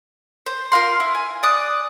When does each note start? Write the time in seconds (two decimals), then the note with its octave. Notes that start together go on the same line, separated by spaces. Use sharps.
0.46 C5
0.72 F4 A#4 F5 C6
1.00 E4
1.15 G#5
1.43 D5 D#6 F#6